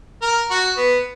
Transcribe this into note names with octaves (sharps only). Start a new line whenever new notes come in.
A#4
F#4
B3